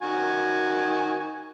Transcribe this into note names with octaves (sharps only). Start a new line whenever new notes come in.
D#3 F#4 G#5